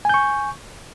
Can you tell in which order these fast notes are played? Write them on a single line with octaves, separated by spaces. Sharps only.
G#5 G6 C#6